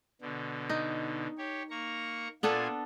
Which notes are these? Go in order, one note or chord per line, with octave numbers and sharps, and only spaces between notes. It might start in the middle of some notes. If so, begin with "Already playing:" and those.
B2 D3
D#4
G4 C#5
A#3 A#5 C#6
A#2 B3 D4 F4 A4 G#5